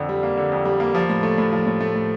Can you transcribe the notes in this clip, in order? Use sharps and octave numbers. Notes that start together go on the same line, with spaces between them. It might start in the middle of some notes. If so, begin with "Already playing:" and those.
Already playing: F2 D3
G3
A#3
D3
F2
G3
A#3
F3
A2
A3
A2
F3
A2
A3
A2